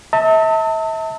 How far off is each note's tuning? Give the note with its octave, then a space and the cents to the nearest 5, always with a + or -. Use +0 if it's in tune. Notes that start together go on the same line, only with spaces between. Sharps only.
E5 -40 A5 +35